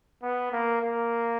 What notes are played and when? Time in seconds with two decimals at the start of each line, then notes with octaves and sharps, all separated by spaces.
0.22 B3
0.52 A#3
0.82 A#3